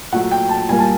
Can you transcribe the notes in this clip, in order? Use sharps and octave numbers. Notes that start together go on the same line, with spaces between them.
A#2 F#3 A3 F#5
G5
A5
A#2 G3 A#3 G#5
A5